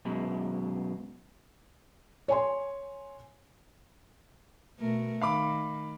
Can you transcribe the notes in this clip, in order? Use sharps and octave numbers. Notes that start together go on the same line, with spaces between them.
F#2 B2 G#3
C#5 G#5 C6
B2 A3 A#4
D#3 F5 B5 D6